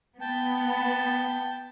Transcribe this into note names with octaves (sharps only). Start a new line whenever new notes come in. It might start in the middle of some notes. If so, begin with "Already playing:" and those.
B3 G5 A5